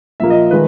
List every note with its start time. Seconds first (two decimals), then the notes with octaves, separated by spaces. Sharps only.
0.20 A#2 F3 A#3 E5
0.30 D#5
0.51 D#3 G#3 B4